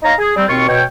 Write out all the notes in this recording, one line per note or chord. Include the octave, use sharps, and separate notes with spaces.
D#4 C#5 F5 A#5
G#4
G3 C4
D#2 B2 C4 F4 C#6
B2 C#5 G5